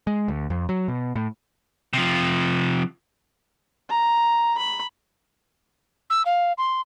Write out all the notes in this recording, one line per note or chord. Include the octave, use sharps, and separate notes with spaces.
G#3
D2
F2
F#3
B2
A2
C3 F3
A#5
B5
E6
F5
C6